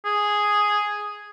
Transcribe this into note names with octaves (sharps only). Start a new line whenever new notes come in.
G#4